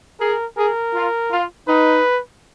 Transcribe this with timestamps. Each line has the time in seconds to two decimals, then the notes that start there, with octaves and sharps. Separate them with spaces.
0.20 G#4 A#4
0.57 G#4 A#4
0.94 F4
1.31 F4
1.68 D#4 B4